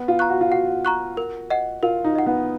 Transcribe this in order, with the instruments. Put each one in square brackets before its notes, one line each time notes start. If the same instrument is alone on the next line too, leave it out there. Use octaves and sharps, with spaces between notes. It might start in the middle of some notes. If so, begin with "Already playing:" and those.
Already playing: [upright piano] B3
F4
[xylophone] A#5 C#6 F#6
[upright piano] F#4
F4
[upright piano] F#4 [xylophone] F#5
[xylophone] A#5 C#6 F#6
A#4
D#5 F#5
[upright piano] F4 [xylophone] A#4
[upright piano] D#4
[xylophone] D#5 F#5
[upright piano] B3